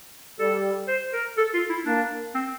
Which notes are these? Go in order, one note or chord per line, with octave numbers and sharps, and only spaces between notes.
G3 A4
C5
A#4
A4
F4
E4
A#3 D4
C4